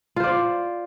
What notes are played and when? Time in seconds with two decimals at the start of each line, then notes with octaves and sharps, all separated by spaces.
0.16 F4
0.20 C5
0.24 D5